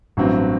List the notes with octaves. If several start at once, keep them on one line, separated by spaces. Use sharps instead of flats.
A1 G2 F#3 C4